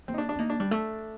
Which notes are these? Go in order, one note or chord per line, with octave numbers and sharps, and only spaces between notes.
A#3 C4
D#4
D4
D4
C4
A#3 D#4
D4
G3 D4
A3